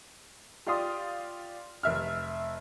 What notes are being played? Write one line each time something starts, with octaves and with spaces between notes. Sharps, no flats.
F4 G4 D5 F5 C6 D#6
F1 E5 F6